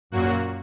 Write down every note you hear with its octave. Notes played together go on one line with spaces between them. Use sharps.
F#2 A#2 F#3 A#3 F#4